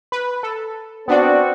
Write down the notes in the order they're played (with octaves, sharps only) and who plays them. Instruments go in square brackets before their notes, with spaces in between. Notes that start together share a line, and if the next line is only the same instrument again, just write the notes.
[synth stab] B4
A4
[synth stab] B3 D4 D5 [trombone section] C4 F#4